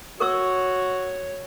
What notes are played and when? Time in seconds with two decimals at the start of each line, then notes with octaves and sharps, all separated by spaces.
0.20 F#4 A#4 C#5 C#6 E6